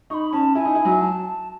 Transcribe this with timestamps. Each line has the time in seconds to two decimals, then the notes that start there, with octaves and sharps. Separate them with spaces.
0.10 D#4 C#6
0.14 B5
0.33 C#4 A5
0.55 E4 G#5
0.65 D#4
0.75 E4
0.85 F#3
1.01 A5